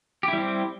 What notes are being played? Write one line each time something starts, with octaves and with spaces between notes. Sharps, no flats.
G3 C4 E4 G4